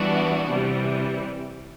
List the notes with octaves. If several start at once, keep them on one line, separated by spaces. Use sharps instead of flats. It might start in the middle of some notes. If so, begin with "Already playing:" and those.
Already playing: E3 G3 B3 D4 F#4
C3 E3 G3